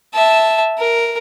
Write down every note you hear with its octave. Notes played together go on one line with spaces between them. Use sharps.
E5 A5
A#4